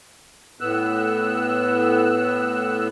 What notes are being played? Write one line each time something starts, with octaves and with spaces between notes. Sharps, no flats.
A2 B3 E6 F#6